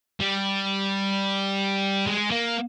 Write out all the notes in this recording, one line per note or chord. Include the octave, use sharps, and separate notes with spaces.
G3
G#3
A#3